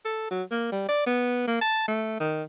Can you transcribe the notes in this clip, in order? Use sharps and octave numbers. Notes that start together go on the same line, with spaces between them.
A4
F#3
A#3
G3
D5
B3
A#3
A5
A3
D#3